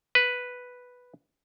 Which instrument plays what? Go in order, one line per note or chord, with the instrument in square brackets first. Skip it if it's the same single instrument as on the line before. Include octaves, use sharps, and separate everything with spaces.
[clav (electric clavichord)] B4